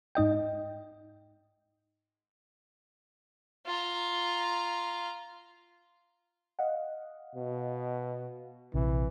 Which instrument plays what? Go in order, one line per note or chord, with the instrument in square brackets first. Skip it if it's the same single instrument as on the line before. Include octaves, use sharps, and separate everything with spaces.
[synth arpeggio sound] G#2 D#4 D#5 G5
[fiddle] F4 A#5
[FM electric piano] D#5 F5 F#5
[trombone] B2
[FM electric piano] A#1 C3 [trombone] E3